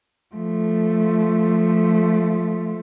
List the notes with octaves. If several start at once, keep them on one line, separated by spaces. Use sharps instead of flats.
F3 A3